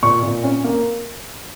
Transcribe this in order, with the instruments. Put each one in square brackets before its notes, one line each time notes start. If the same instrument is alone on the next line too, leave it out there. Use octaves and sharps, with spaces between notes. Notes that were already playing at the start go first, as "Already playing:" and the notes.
[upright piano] A#2 C#6
A#2
C#4
A#3